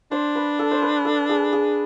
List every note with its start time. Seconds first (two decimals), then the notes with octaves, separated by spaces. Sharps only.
0.11 D4 C5
0.35 B4
0.59 A4
0.71 C5
0.82 B4
1.05 A4
1.29 G#4
1.53 G#4